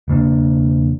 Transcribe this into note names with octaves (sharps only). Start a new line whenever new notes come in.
E1 C#3 A#3 D4